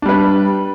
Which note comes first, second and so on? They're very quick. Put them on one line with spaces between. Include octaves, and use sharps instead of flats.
D4 G3 B4